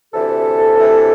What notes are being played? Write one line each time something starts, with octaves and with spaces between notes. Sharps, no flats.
D2 C3 E3 A4
D2 C3 E3